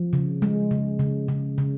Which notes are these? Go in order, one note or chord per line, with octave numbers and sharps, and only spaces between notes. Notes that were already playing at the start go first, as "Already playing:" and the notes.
Already playing: F3
C#3
G#3
C#3
C#3
C#3
C#3